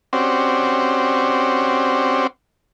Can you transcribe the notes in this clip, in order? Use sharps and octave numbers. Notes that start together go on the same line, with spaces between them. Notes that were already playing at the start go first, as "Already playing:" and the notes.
C4 C#4 F#4 G4 C5 D5